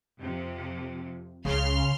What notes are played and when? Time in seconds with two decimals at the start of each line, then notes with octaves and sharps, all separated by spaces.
0.18 F2 C3
1.45 C#2 C#3 G#3 C6 F6